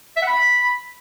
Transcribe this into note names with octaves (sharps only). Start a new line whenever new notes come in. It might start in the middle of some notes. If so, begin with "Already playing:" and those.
E5
F#5
B5